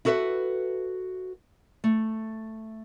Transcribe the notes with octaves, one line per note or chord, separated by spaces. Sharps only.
E4 F#4 A4 B4 E5
A3